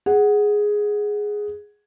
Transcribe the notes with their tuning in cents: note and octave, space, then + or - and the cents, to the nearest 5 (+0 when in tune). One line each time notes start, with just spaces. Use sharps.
G#4 +0 F#5 +0